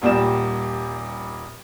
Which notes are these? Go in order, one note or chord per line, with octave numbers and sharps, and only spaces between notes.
D#1 A#2 G3 D5 E7